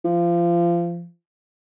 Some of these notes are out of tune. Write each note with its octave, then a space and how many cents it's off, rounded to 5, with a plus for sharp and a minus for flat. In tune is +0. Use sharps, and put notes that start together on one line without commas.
F3 -25